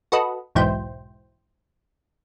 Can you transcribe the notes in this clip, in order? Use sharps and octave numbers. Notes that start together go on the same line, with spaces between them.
F#4 A4 B4 D#5
B1 E2 G#2 E4 C5 G5